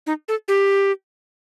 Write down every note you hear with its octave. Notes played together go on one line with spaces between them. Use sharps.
D#4
A4
G4